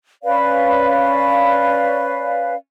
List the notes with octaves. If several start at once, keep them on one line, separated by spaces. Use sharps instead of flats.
C#4 B4 D5 F5